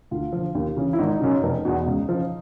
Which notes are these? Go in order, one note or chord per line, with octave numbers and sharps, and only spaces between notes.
D2 F4
D3 F3
D#2
C#3 E3
E4
G#1 D#4
F#2 C#3
F1
E2 B2
C#2
C#3 F3